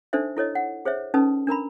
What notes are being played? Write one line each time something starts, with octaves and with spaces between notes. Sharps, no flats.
D4 D#4 A4 C5 E5
E4 A4 C#5 D#5
F#5
G#4 C5 C#5 E5
C#4 D#4 A4 B4 A5 D#6
D4 A#4 A#5 B5